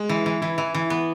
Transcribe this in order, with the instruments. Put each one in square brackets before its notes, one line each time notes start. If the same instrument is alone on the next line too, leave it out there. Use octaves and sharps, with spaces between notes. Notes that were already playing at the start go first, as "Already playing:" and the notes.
Already playing: [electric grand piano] G#3
[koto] E3
E3
[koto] E3 [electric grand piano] E4
[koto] E3
E3
B3